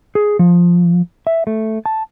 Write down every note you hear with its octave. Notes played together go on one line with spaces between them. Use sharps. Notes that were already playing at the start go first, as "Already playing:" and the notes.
G#4
F3
E5
A3
A5